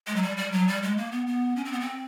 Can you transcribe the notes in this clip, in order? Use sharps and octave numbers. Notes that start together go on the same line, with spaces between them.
G#3
F#3
G3
G3
F#3
G3
G#3
A#3
B3
B3
C#4
C4
B3
C4